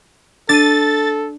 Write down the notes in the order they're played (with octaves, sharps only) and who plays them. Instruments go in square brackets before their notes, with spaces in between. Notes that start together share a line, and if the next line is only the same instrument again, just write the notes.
[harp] D4 D#7 [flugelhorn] A4 [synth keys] A6